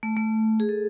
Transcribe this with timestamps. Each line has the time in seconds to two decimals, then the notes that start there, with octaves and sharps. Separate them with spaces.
0.03 A3
0.17 A3
0.60 G#4
0.69 A4